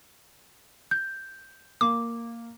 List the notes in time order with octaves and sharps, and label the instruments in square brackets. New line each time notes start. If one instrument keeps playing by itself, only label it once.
[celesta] G6
[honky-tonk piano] A#3 [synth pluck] D6